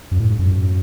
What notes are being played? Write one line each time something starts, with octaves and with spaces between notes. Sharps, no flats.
F#2
A2
G#2
F#2